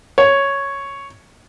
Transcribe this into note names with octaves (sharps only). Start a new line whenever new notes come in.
C#5